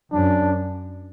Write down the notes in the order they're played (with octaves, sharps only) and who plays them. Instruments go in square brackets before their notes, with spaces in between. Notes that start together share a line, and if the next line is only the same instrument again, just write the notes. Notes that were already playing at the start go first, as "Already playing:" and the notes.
[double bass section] F#2 [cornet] D4